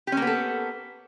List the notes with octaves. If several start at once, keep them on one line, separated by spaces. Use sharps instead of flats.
A#3 B3 C#4 G4 A4